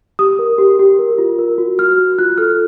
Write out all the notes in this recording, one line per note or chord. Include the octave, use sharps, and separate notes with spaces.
G4 D#6
A#4
G4
G4
A#4
F4
A#4
F#4
F#4 F6
F#4
F4 F#6
A4 F6